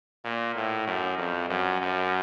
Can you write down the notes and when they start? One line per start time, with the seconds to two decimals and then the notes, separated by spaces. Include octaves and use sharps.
0.24 A#2
0.56 A2
0.87 F#2
1.18 F2
1.50 F#2
1.81 F#2